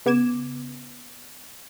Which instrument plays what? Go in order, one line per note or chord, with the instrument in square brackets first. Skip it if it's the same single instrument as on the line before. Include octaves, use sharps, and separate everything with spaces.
[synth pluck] C#3 B3 D6 G#6 E7